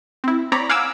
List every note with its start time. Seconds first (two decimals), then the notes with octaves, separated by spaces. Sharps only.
0.24 C4 E4
0.52 C4 C#5 D5 A#5 B5
0.69 F5 F#5 G#5 D6 E6